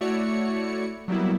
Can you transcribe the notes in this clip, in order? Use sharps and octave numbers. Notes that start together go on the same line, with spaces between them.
A3 E4 F#4 C#5 D5 C#7
F#3 G3 A#3 B3 E4